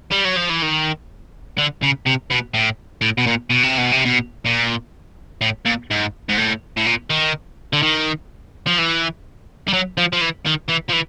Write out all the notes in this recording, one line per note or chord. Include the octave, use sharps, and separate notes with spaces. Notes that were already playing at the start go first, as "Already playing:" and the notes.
G3
F#3
F3
E3
D#3
D3
C#3
C3
B2
A2
A2
B2
A#2
B2
C3
B2
C3
B2
A#2
A2
A#2
G#2
G#2
A2
A2
A#2
D#3
D3
D#3
F3
E3
G3
F#3
F3
F3
E3
D#3
E3
F3
E3